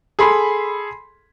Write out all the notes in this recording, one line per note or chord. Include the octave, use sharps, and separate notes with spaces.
G#4 A4 B5 C6